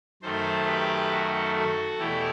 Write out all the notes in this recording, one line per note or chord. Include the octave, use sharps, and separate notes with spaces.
F#2 D#3 A3 A4 C5
G4 B4
F#4 A4
F#4 A4
E2 B2 A3 E4 G4